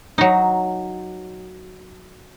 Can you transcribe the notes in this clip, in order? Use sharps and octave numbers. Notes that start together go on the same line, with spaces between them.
F#3 D#4